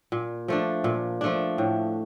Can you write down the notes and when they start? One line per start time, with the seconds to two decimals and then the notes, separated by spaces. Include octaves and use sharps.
0.12 A#2
0.48 F3 A3 D4
0.84 A#2
1.21 F3 A3 D4
1.58 A2